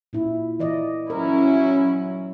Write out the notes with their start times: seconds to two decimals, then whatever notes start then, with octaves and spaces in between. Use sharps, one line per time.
0.13 A#2 E4
0.60 E3 D5 D#5
1.10 F#3 C#4 E4 A#4